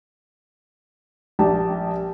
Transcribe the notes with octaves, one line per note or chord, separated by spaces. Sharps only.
A#1 G4 A5